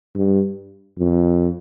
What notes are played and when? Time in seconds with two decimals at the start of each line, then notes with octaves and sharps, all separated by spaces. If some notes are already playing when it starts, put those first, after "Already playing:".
0.15 G2
0.99 F2